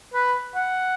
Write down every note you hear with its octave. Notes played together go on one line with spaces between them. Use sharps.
B4
F#5